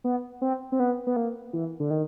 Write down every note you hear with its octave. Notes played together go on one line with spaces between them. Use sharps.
B3
C4
C4
B3
B3
A#3
E3
D3
D#3